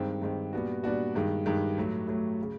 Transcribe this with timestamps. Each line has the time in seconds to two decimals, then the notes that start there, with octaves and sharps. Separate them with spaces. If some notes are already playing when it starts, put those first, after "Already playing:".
Already playing: G2 D#3 G#3 C4
0.22 G2 D#3 G#3 C4
0.53 A#2 G3 B3 D4 F#4
0.84 A#2 G3 B3 D4 F#4
1.15 G2 D#3 G#3
1.46 G2 D#3 G#3
1.77 A2 F#3 A3
2.07 A2 F#3 A3
2.43 C#3